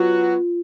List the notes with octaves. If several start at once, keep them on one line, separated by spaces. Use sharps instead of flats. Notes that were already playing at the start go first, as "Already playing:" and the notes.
Already playing: F#3 B3 F4 F#4